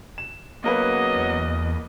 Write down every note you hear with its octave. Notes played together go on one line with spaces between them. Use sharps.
E7
C#3 F#3 A#3 B3 A#4 B4 D#5
E2